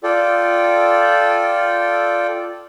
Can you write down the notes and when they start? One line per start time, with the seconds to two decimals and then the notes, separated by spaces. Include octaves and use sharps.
0.03 F4 A4 D5 G5